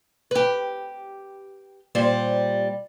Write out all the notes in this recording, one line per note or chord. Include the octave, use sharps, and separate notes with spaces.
G4 B4
A#2 G3 C5